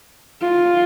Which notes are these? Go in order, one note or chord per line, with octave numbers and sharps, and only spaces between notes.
F4